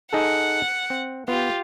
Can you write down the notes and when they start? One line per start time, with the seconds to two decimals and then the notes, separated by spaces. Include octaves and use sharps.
0.13 D#4 G#4 A4 F#5
0.90 C4
1.28 B3 F4 G4